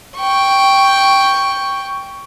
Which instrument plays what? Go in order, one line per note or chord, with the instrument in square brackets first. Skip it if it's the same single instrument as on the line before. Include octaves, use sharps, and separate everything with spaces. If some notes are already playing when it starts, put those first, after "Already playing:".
[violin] G5 C#6